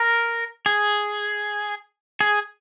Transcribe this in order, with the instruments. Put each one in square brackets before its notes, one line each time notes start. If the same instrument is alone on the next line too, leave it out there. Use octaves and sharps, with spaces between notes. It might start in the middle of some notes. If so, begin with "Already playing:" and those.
Already playing: [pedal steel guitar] A#4
G#4
G#4